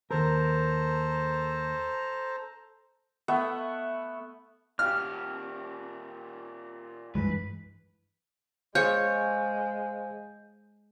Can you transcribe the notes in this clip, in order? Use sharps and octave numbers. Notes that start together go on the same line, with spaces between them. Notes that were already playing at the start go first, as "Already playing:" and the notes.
D#2 A4 A#4 C5 A#5
A3 B3 E5 F#5
A#2 G4 F6
G2 E3 G#3 B4
G#3 G#4 C5 C#5 F5 G6